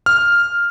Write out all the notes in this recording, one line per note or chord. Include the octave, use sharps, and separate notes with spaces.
F6